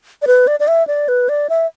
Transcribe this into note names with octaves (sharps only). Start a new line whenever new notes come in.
D5
B4
D5
D5
E5
D5
B4
D5
E5